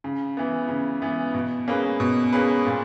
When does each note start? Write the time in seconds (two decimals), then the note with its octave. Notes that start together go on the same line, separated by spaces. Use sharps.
0.04 C#3
0.37 E3 B3
0.69 C#3
1.02 E3 B3
1.34 B2
1.68 A#3 C#4 G#4 B4
2.00 B2
2.32 A#3 C#4 G#4 B4
2.65 A#2